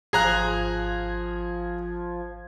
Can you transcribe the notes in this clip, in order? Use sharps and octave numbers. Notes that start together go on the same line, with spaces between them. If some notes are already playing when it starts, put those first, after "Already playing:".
G#1 F3 G#4 A#5 F#6 G#6